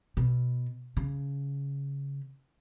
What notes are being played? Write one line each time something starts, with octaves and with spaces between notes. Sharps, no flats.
B2
C#3